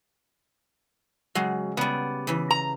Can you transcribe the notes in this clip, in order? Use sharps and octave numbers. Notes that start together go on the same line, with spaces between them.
C#3 F#3 G#3
C#3 G3 B3 D5
C#3 E3
A#5